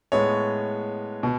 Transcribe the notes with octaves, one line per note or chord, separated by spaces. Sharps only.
A2 G#3 B3 C#5
B2